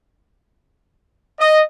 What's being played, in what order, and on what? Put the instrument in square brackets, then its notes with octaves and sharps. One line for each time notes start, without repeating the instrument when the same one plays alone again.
[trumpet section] D#5